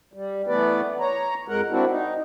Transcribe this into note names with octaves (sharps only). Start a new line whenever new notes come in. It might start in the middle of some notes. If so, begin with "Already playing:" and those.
G3
E3 A3 B3 B4 D5
C#5 A#5
F2 G#3 A#4 F#5
C4 D4 E4 F#4
D#4